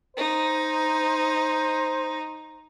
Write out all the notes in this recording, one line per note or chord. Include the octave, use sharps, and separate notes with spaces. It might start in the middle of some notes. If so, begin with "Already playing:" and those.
D#4 C5